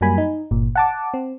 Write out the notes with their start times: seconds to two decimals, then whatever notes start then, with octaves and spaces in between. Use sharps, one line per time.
0.01 F#2 F#3 G3 A#3 G#5 B5
0.18 D#4
0.51 G1 A#2
0.75 F#5 A5 D6
1.14 C4